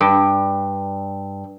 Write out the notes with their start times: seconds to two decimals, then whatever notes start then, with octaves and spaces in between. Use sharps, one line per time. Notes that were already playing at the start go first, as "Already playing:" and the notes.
0.01 G2